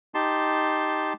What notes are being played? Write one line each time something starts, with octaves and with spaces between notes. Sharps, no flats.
D#4 G4 A5 C6